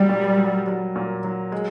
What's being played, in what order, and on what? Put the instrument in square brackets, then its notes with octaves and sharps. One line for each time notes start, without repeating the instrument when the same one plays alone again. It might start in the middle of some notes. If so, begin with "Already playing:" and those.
Already playing: [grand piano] F#3 [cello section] G3
[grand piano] A#2
F#3
F#3
A#2
F#3
G#3